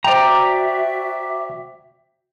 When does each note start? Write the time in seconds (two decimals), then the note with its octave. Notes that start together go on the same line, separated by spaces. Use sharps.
0.04 F#4 C5 D5 E5 G5 A#5